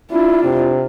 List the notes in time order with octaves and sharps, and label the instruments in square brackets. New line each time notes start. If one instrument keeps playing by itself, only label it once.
[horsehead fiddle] D4 F4 [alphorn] E4
[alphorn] C3